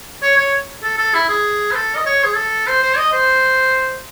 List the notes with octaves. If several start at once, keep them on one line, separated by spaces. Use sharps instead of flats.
C#5
C#5
A4
A4
E4
G#4
C5
A4
D#5
C#5
G#4
A4
C5
C5
D#5
C5